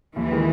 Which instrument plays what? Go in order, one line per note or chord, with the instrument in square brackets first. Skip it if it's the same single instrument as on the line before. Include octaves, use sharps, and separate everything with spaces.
[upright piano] D#2 [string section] E3
[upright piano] D#3 G#3